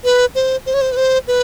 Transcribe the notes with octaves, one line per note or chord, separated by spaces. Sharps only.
B4
C5
C5
C#5
C5
B4
C5
B4